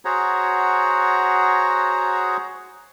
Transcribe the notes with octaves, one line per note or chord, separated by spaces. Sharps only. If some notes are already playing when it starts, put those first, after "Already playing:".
F#4 G#4 C5 C#5 F#5 A#5